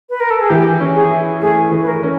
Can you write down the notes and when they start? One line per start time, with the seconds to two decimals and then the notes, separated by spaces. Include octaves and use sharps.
0.09 B4
0.20 A#4
0.30 A4
0.41 G#4
0.49 E3 G4
0.80 C#4
0.95 G#4
1.11 E4
1.41 A3 G#4
1.71 E3
1.81 B4
1.88 A#4
2.03 C#4